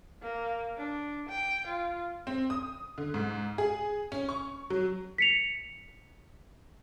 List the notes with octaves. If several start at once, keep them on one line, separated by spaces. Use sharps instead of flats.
A#3
D4
G5
F4
C4
D#6
D3
G#2
G#4
C#4
C#6
F#3
B6 C#7 F7